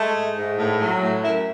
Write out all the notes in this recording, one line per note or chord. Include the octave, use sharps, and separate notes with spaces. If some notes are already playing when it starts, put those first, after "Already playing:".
Already playing: G#3 A3
G#2
G#2
A2
F#3
A2
F#2 E4